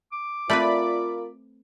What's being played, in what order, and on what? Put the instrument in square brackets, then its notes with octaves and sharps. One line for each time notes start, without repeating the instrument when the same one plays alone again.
[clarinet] D6
[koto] A3 C4 B4 [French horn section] F4 A#4 [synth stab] D5 B5